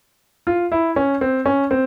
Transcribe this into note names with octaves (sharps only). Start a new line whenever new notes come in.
F4
E4
C#4
C4
C#4
C4